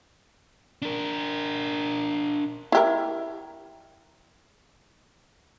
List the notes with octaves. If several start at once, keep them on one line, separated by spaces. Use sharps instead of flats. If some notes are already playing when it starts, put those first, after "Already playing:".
D4 A#4
E4 G4 A#4